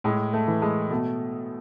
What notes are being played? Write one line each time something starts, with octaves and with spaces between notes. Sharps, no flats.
A2 G#3
A3
E3
G#3
B2 A3